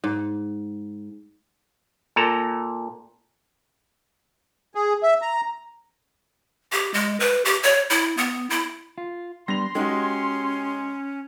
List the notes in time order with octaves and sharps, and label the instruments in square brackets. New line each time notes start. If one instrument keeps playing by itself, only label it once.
[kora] G#2
[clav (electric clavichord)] A#2 A4 A#5
[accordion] G#4
E5
A#5
[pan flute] G4
G#3
B4
G4
C#5
E4
B3
E4
[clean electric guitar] F4
[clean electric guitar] G3 B3 D4 [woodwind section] C6 [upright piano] A#6 F7
[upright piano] G#3 D#4 F#4 [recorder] C#4 [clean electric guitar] G4